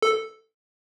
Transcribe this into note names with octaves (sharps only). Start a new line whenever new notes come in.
A4